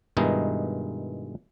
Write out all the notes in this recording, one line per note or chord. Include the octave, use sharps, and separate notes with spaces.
G2 B2 D#3 G#3 D#4 E4